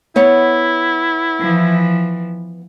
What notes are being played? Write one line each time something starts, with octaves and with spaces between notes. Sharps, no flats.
B3 E4 C#5 F#5
E3 F3